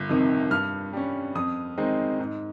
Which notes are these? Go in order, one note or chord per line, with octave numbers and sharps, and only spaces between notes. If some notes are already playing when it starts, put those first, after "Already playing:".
Already playing: G1
F2 C3 D#3
G2 F6
G3 C#4
F2 D#6
D#3 G#3 C4 D#4
G#2